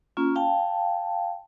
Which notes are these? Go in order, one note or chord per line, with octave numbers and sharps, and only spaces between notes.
A#3 C#4 F4
F5 G5 A5